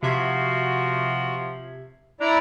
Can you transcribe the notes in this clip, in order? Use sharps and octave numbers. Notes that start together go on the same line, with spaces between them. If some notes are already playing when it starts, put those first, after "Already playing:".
C3 F3 F#4 E5 G#6
D4 E4 D5 A#5